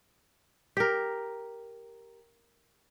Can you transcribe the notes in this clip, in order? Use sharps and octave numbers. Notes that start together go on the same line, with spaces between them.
G4 A#4